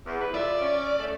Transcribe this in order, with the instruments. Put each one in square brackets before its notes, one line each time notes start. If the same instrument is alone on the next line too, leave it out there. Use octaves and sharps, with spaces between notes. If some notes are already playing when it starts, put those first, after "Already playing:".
[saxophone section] E2
E3 E4 B4
[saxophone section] F4 A4 E5 [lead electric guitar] D5
[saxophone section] C#4
A3